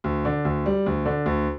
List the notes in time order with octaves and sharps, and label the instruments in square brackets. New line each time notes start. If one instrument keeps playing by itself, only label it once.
[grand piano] D2
D3
D2
G3
D2
D3
D2